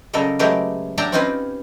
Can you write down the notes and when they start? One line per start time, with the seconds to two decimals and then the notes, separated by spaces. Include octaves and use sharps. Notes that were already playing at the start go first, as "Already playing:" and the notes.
0.13 C#3 F#3 G3 A4 A#4 D#5
0.39 F#3 G#3 A3 G4 A#4 B4
0.98 F#3 D4 D5 E5 G5 A#5
1.12 C4 C#4 D#4 F4 G4 B4